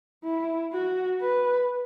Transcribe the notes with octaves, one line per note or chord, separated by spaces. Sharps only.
E4
F#4
B4